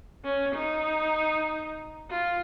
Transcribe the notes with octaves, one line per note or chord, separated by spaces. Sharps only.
C#4
D#4
F4